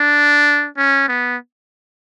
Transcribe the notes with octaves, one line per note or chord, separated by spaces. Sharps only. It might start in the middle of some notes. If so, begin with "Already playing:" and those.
Already playing: D4
C#4
B3